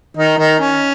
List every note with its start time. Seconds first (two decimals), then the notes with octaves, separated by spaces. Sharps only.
0.17 D#3 D#4
0.38 D#3 D#4
0.59 C#4